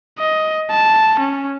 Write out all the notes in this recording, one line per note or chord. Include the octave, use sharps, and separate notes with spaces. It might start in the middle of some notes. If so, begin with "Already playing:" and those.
D#5
A5
C#4